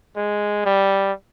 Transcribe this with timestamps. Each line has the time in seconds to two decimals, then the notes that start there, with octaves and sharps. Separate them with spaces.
0.16 G#3
0.66 G3